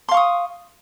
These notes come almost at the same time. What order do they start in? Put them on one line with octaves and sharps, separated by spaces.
C6 F5 C#6 D#6